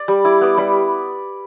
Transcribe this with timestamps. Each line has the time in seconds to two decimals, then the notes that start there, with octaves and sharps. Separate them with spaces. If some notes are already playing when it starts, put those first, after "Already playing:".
Already playing: D5
0.08 G3
0.25 E4 D6
0.41 B3 D6
0.58 G3 B5